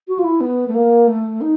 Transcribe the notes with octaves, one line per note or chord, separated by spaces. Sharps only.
F#4
F4
E4
B3
A3
A#3
A3
D#4